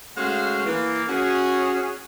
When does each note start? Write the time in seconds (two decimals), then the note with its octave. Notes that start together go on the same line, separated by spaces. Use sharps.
0.17 G#3 A3 C#4 F#4 C5 F5
0.65 E3 A#3
1.08 C#4 F#4 G#4